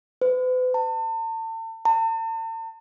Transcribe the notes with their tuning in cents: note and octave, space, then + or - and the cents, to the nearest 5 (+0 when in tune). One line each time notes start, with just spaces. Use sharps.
B4 +45
A5 +40
A5 +45